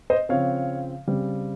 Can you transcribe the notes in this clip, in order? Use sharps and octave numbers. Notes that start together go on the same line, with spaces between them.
C5 D#5
C#3 F3 C4 C#5 F5
C#3 G3 C4